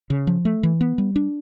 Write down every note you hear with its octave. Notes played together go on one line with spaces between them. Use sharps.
C#3
F3
A3
E3
B3
G3
D4